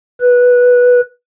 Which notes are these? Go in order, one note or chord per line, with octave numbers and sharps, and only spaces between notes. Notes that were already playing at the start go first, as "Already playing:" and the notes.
B4